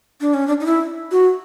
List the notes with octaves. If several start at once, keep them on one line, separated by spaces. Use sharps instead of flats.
D4
C#4
D4
D#4
E4
F#4